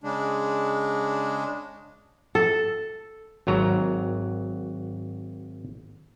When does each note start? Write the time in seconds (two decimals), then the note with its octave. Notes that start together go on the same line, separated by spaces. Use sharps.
0.04 C#3 G#3 D4
2.35 A4
3.47 G#1 F#3 A#5